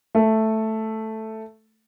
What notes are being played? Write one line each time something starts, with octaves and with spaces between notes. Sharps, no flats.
A3 A4